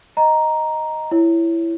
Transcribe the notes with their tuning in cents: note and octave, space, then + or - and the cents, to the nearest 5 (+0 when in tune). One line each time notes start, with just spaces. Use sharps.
D#5 +0 A#5 +5
E4 +15 C#5 +5